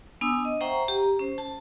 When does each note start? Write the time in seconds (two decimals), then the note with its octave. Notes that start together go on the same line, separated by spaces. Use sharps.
0.21 B3 D4 G#5 D#6 E6
0.45 D#5
0.61 C5 E5 F#5 G5 A#5 C#6
0.88 G4 A#5
1.19 C#4 C5
1.38 A5